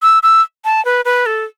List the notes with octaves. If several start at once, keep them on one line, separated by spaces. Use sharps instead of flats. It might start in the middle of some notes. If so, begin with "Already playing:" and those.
E6
E6
A5
B4
B4
A4